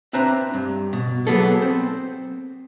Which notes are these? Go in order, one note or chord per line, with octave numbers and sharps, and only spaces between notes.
C4 D4 B4 C5 E5 A#5
G2
B2
F#3 G3 A#3 B3 G#4 A4
C4 C5